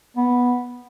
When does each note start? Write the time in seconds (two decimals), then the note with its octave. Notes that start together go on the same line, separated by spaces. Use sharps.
0.17 B3